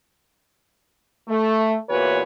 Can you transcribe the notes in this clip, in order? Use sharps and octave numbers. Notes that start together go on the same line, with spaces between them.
A3
E2 A#2 E3 F#4 B4 C#5